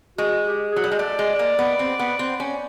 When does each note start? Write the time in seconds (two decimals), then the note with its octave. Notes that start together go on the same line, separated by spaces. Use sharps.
0.18 G#3 F#4
0.45 G4
0.72 F#3 G#4
0.84 G3
0.91 G#3
0.99 A3 D5
1.19 G#3
1.39 A#3
1.59 B3
1.79 C4
1.99 B3
2.19 C4
2.40 C#4